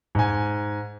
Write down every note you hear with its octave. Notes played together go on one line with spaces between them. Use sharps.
G#2 G#5